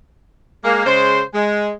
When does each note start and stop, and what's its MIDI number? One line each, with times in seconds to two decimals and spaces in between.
0.64 0.84 56
0.64 0.84 58
0.86 1.21 49
0.86 1.21 56
0.86 1.21 72
1.34 1.71 56